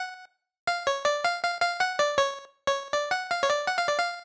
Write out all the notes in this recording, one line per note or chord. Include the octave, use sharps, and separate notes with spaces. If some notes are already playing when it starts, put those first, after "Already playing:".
Already playing: F#5
F5
C#5
D5
F5
F5
F5
F#5
D5
C#5
C#5
D5
F#5
F5
C#5
D5
F#5
F5
D5
F5